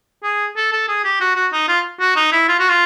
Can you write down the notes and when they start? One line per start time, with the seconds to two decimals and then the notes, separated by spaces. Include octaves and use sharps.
0.23 G#4
0.56 A4
0.72 A4
0.88 G#4
1.04 G4
1.20 F#4
1.36 F#4
1.52 D#4
1.68 F4
2.00 F#4
2.16 D#4
2.32 E4
2.48 F4
2.60 F#4
2.69 F4